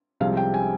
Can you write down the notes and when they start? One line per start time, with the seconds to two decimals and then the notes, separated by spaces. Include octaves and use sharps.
0.20 C2 C3 F3 G#3 F5
0.37 G5
0.54 G#5